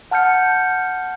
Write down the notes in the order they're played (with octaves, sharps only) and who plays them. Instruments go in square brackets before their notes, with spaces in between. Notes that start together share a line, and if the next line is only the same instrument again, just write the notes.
[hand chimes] F#5 A5 F6 G6 C#7